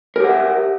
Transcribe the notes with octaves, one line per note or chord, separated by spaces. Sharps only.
G4 A#4 E5 F#5